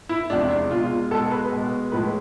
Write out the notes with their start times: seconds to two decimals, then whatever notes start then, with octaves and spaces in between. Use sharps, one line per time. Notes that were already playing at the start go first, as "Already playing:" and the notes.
0.09 E4
0.30 E2 C3 F3 G#3 D4
0.50 D4
0.70 B2 G#3 F4
1.11 B2 A4
1.14 G#3
1.31 B4
1.52 B2 G#3
1.92 A2 F3 G#3 B4